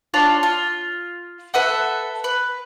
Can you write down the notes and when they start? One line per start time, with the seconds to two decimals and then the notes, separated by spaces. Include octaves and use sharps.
0.14 D4 F4 C#5 A5
0.43 F4
1.54 A4 B4 E5 F#5
2.24 B4